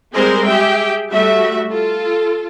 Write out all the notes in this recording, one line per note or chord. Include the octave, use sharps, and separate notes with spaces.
G3 G#3 C4 G#4 A#4 C5
G4 G#4 E5 G5
G3 A3 F#4 E5
F4 A4